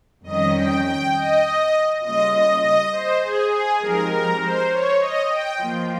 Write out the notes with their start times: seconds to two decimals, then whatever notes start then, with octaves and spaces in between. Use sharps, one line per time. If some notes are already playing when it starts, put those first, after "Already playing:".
0.24 F2 D#3 G3 C#4 D#5
0.55 G5
0.84 G5
1.13 D#5
2.02 C#3 G3 A#3 F4 D#5
2.32 D#5
2.62 D#5
2.92 C5
3.21 G#4
3.51 G#4
3.81 F3 G#3 C4 D#4 G4 A#4
4.10 A#4
4.40 C5
4.70 C#5
4.99 D#5
5.30 G5
5.59 F3 A#3 F4